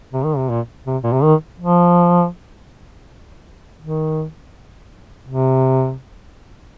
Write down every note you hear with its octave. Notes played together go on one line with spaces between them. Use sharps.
C3
D#3
C3
A#2
C3
A#2
C3
D#3
F3
D#3
C3